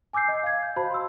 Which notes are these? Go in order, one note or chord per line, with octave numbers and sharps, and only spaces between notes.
G#5 D6 E6 G6 C7
D#5
F5 G#6
G6
F#4 C5 F5 A5 B5
C6 E6